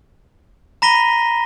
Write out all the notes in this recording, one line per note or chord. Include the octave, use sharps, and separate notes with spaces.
A#5 B5 A#6 B6 D#7 G7